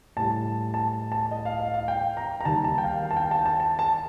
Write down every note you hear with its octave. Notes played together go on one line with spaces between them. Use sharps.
A2 G3 A5
A5
A5
D#5
F5
F5
F5
G5
A#5
A#5
D#2 D#3 G3 A5
A5
G5
F5
F5
A5
G5
A5
A5
A5
A5